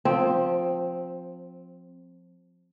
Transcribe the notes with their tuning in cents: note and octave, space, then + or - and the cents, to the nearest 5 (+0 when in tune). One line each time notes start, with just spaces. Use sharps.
F3 +20 C4 +0